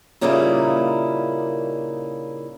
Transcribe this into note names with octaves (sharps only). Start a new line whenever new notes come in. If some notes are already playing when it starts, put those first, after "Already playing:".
A#2 C#3 G3 A#3 D#4 E4